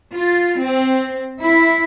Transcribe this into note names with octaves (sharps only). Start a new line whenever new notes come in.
F4
C4
E4